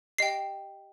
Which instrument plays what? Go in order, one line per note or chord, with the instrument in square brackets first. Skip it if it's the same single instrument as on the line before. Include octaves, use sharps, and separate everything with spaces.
[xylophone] G4 D#5 G5 C7